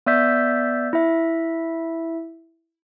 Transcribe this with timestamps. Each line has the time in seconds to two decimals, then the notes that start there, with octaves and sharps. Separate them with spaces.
0.06 B3 D5 E5 E6 G6 B6
0.93 E4 E5